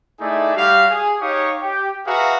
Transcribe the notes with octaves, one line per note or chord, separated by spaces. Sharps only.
A3 D#4 E4 G#4 D5 E5
G3 F#4 G4 F5
G#4
D#4 G4 C#5 F5 C#6 D#6
G4 G5
F#4 G#4 B4 E5 F5 A#5